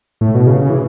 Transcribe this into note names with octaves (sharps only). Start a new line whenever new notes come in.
A2
B2
C#3
C#3
E3